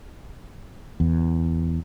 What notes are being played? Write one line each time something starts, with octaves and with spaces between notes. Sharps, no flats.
E2